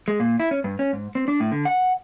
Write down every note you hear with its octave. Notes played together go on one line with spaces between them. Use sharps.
G#3
A#2
E4
C#4
G2
C#4
G#2
C4
D4
A2
D3
F#5